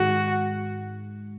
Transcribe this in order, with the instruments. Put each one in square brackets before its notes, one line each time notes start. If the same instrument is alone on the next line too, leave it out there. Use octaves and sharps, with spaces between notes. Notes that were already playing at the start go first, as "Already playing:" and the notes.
Already playing: [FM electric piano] G#2 D#3 G#3 [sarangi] F#4